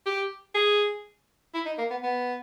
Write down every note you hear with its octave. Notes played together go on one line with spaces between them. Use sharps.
G4
G#4
E4
D#4
A#3
B3
B3